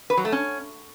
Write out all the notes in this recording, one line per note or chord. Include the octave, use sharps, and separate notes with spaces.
B4
F#3
A3
C#4